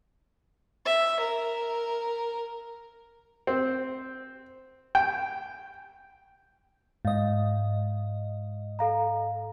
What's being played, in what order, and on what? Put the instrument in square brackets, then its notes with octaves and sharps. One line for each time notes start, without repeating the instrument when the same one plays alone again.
[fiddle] E5
A#4
[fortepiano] C4
G5
[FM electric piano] G#2 D#5 [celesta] F5
[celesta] A4 F5 A#5